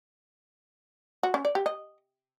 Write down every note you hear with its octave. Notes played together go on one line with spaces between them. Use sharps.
F#4
C#4
D5
G4
D#5